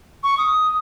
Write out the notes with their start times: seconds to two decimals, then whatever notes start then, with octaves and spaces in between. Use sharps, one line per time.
0.24 C#6
0.38 D#6